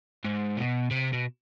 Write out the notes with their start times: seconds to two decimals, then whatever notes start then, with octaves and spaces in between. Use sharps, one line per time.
0.24 G#2
0.57 B2
0.91 C3
1.13 B2